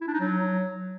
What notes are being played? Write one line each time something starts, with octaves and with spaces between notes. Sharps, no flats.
E4
D4
D#4
F#3